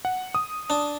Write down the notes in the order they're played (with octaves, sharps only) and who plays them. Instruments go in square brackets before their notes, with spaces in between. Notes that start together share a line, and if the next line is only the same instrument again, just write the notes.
[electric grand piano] F#5
D#6
[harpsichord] D4